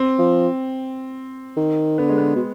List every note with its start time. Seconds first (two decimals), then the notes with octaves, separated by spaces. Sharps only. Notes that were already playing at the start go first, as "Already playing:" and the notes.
Already playing: C4
0.19 F3
1.57 D#3
1.98 D3 B3
2.09 G#3
2.18 B3
2.36 B2